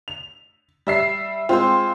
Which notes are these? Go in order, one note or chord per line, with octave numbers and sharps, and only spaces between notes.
F7
G3 E5 C7
G#3 C4 F4 C5